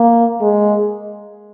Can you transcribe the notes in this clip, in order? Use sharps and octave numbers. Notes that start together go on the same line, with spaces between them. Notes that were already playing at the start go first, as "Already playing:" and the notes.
Already playing: A#3
G#3